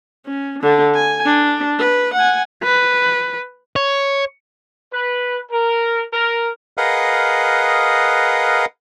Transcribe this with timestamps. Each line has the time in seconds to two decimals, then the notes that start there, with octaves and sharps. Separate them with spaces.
0.26 C#4
0.62 D3 D4
0.94 G#5
1.25 D4
1.78 B4
2.15 F#5 G#5
2.63 B4
3.76 C#5
4.93 B4
5.52 A#4
6.13 A#4
6.78 G#4 A#4 B4 D#5 F5 F#5